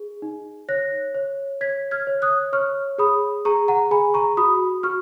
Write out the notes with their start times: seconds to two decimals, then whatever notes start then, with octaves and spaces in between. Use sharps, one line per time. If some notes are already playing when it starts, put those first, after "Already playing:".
Already playing: G#4
0.22 D#4
0.69 C#5 F#6 A#6
1.15 C#5
1.61 C#5 G#6 B6
1.91 F6 G#6
2.07 C#5
2.22 D#6 F#6
2.53 C#5 C#6 F6
2.98 G#4 B5 D#6
3.45 G#4 A#5 C#6
3.68 F#5 A#5
3.91 G#4 G#5 B5
4.14 A#5 C#6
4.37 F#4 B5 D#6
4.83 F#4 C#6 F6